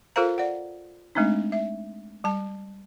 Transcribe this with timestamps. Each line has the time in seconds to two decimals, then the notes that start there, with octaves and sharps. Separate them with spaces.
0.16 F4 A4 A#4 C5 F5 A#5
0.38 D5 F#5
1.15 G#3 A3 C4 D4 D#4
1.52 E5
2.24 G3 A5